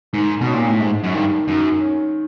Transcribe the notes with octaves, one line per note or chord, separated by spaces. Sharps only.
G#2 D#3
B2
C#4
A#2
A2
G#2 G#3
F#2
G2 D#3
F#2 D#3
C#4